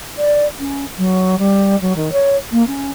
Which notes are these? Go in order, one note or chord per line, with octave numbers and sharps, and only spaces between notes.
D5
C#4
F#3
G3
F#3
D#3
C#5
A#3
C#4